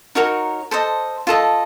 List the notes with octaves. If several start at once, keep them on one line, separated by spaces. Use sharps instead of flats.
D#4 F#4 A#4 C#5
A4 C5 D#5
F4 A4 D#5